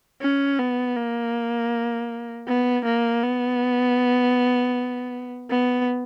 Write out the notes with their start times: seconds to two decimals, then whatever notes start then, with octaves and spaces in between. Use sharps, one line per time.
0.21 C#4
0.59 B3
0.96 A#3
2.47 B3
2.85 A#3
3.23 B3
5.50 B3